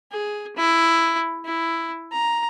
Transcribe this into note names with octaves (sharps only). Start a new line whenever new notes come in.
G#4
E4
E4
A#5